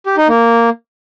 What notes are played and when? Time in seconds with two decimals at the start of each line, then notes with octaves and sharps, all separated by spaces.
0.06 G4
0.17 D#4
0.28 A#3